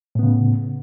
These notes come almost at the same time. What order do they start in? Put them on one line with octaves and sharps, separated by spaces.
A2 B3 C#3